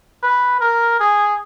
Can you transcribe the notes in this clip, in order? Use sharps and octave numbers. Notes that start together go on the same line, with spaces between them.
B4
A#4
G#4